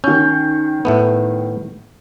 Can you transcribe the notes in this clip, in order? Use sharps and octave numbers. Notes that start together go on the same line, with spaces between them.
D#3 C#4 G6
A2 A3 B3